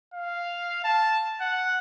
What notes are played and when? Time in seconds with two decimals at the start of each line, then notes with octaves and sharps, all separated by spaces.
0.14 F5
0.84 A5
1.41 F#5